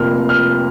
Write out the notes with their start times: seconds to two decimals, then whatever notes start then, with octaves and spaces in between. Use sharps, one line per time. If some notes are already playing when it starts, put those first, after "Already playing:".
Already playing: F1 F2 F3 A#3 F6
0.29 F6